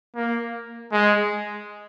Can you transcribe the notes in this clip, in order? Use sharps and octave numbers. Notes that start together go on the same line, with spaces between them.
A#3
G#3